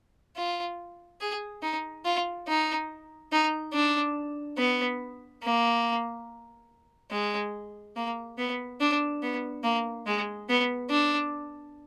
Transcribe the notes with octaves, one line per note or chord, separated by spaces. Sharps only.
F4
G#4
D#4
F4
D#4
D#4
D4
B3
A#3
G#3
A#3
B3
D4
B3
A#3
G#3
B3
D4